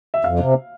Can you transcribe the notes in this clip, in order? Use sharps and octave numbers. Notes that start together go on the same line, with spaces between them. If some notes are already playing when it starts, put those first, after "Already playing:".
E5
F2 F5
C3